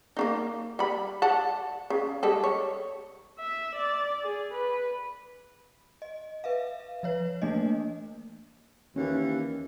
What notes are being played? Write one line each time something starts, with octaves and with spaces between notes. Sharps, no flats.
A#3 D4 D#4
G3 B5
D5 F#5 A5
C#3
G3 G#3 A4
C#5
E5
D5
G#4
B4
D#5
B4 E5 F5
F3 B4 C#5
E3 A3 A#3 D4 D#5
D#2 E3 C#4